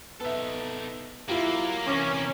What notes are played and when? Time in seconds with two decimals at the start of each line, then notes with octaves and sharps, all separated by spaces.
0.21 B3 D#4 A4 E5
1.28 F#3 A#3 E4 F4 G4
1.88 E2 C3 C#4 D6